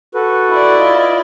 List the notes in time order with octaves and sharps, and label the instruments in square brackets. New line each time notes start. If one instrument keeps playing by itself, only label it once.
[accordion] F#4 A4 B4
[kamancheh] E4 D5
[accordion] F4 D#5